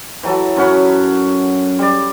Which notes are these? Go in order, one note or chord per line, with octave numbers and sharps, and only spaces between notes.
E3 F#3 A4
F#2 C#4 F#5 B5
G3 D5